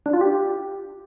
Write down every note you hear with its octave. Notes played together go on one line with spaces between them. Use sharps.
D4
F4
G4